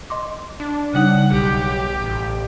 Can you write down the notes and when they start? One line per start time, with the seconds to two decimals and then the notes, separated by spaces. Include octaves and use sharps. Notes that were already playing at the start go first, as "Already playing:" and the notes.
0.10 D#5 C6 D6
0.60 D4
0.94 C#3 G3 D#4 F#5
1.32 B1 G4
2.02 A1